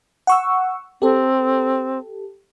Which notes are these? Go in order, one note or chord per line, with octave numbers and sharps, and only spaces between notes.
F#5 C#6 E6
C4 G4 A4